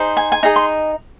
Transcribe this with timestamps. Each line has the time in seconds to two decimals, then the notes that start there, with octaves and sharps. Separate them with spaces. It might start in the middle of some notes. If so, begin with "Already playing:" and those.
Already playing: D#4 G#4 C5
0.17 G#5
0.32 G#5
0.43 D#4 G#4 D#5 A#5
0.56 C6